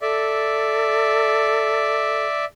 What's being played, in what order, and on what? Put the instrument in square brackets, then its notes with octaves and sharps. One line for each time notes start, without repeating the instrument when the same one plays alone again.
[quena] A4 [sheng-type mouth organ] D5 E5